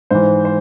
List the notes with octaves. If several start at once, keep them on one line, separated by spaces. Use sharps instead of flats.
G#2 E3 C5
C5